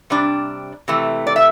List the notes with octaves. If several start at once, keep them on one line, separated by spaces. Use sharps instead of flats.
C3 G3 D4
C3 E3 A3
D5
E5